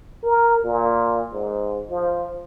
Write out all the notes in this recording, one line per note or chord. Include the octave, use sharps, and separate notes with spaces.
A#4
A#2
G#2
F3